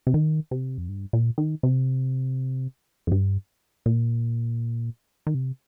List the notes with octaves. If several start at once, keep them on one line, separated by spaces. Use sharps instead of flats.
C3
D#3
C3
F2
G2
A#2
D#3
C3
F2
G2
A#2
D#3
C3